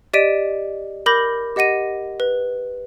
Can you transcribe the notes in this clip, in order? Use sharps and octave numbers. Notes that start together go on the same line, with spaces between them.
G4 D5 D#5 B6 D7 D#7
A#4 B5 D6 G6 A#6 F#7
G4 D#5 F#5 A#6 D#7
B4